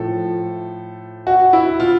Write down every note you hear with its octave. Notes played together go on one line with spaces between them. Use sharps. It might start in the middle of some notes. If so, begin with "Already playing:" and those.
Already playing: A2 F3 A4
F#4
E4
F4